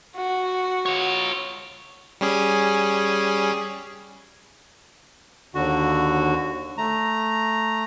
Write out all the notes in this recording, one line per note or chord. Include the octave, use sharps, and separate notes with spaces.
F#4
F4 C#5
G3 C#4 G#4
D#2 D3 F#4
A3 A#5